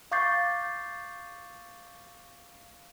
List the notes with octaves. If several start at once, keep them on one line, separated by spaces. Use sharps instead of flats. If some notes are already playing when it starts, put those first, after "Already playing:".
F5 C#6 D6 G6 A6 C7